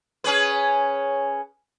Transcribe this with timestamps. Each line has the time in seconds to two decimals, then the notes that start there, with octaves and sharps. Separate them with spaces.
0.24 C#4 G#4 B4
0.53 C#5